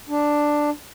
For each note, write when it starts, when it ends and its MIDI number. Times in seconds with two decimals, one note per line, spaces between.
0.09 0.70 62